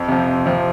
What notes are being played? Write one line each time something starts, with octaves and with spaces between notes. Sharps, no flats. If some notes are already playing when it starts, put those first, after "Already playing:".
Already playing: F2
C3 F3
F2
C3 F3